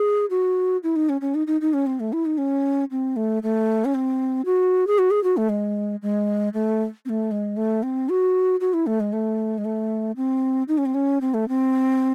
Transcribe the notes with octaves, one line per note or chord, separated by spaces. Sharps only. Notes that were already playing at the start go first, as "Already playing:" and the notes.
Already playing: G#4
F#4
E4
D#4
C#4
C#4
D#4
D#4
D#4
C#4
C4
A3
E4
D#4
C#4
C4
A3
A3
C#4
C4
F#4
G#4
F#4
G#4
F#4
A3
G#3
G#3
A3
C4
A3
G#3
A3
C4
F#4
F#4
E4
A3
G#3
A3
G#3
A3
C4
D#4
C#4
C4
C#4
C4
A3
C4